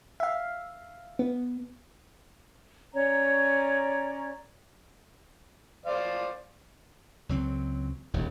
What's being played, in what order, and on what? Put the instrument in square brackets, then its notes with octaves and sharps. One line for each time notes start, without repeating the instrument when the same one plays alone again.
[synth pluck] E5 F5
B3
[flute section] C#4 C#5 D5 A#5
[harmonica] C5 D5 F5
[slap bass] C#2 F#3 C4
E1 A1 D#2